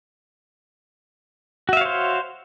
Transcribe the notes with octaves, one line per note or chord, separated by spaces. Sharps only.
F#4 C5 C#5 E5 F5